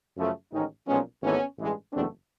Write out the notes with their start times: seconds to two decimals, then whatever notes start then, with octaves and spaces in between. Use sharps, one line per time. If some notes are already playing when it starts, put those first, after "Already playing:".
0.17 F#2 C#3 F3 A3
0.52 A1 G#2 D#3 C#4 D#4
0.87 B1 A#2 F3 G#3 B3 C#4
1.22 G#1 G#2 E3 A3 B3 C#4
1.58 A1 G2 E3 G#3
1.92 F#1 E2 B2 F#3 A3 C4 D4